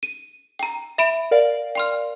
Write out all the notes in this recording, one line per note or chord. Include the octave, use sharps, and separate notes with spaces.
D#7
G5 A#5
E5 B5 D7
A#4 D5 F5
G5 C6 F6